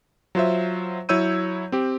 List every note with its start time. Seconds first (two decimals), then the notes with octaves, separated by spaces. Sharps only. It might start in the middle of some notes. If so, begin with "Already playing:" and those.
0.35 F#3 F4 C5 E5
1.09 F#3 E4 C#5 E6 G6 D#7
1.72 C4 G4